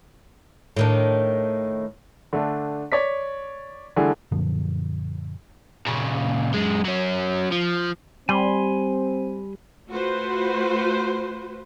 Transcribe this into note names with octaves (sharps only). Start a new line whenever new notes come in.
A2 D#3 D4
D3 A3 D4
C#5 D5 B6
D3 E3 G3 A3 G#4 A4
F#2 A#2 D3 F3
A#2 C#3
F#2 G#3
F#3 C#4
F3
G3 C4 G#5 B5 C6
A3 F4 F#4 B4 C5